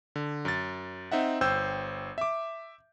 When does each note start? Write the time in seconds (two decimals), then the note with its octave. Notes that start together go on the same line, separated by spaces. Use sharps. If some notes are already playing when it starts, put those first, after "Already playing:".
0.16 D3
0.45 F#2 A6
1.11 C4 D#4 E5 F#5
1.41 G1 C5 G5 E6 G6
2.18 E5 D6